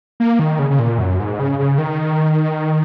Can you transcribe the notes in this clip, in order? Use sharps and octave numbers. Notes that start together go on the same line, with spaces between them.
A#3
D#3
C#3
C#3
A#2
F#2
G#2
C#3
C#3
D#3